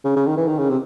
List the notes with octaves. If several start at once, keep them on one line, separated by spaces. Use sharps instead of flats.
C#3
C#3
D#3
E3
D#3
C#3
C3